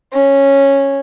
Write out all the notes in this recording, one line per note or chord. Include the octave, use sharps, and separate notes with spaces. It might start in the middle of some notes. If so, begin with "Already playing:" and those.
C#4